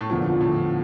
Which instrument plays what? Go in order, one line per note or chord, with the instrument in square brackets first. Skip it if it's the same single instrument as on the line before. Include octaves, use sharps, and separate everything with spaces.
[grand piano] A2
[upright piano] E2 D3 F3 [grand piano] A#2
[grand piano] A2